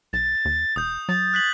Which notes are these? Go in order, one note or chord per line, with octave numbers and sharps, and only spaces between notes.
B1 A6
D#2
E1 D#6 G6
F#3 A6
F#6 B6 F#7